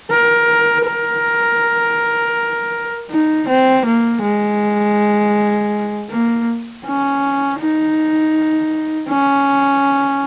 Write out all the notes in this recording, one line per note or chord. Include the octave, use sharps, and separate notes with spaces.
A#4
A#4
D#4
C4
A#3
G#3
A#3
C#4
D#4
C#4